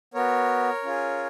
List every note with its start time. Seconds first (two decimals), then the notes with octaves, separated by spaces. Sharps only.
0.14 B3 F#4 A#4 C#5
0.83 C#4 F4 G#4